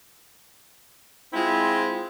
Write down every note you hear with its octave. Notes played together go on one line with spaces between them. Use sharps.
G#3 C4 E4 F4